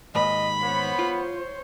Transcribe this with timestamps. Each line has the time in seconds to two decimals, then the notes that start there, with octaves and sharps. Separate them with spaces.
0.15 D#2 G#2 B4 D#5 B5
0.62 B3 C5 C#5
0.99 F4